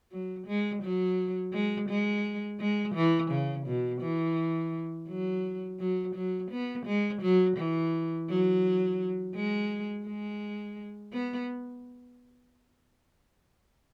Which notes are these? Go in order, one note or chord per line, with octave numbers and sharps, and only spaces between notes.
F#3
G#3
F#3
G#3
G#3
G#3
E3
C#3
B2
E3
F#3
F#3
F#3
B3
G#3
F#3
E3
F#3
G#3
G#3
B3